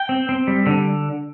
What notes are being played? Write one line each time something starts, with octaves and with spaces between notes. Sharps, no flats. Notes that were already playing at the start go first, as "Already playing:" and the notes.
Already playing: G5
C4
C4
G3
D3